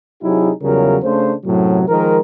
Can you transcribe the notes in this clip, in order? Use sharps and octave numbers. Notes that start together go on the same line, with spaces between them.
C3 F#3 D#4 E4 G4 G#4
E2 C#3 F#3 G3 F4 A#4
C#3 A3 D4 C5
F#2 A2 C3 F#3
D#3 F3 G#3 A#4